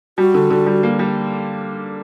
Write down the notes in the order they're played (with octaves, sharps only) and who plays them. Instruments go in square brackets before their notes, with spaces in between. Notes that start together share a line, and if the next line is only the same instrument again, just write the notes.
[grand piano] G3 [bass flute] F#4
[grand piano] D3
D3
G3
A#3
G3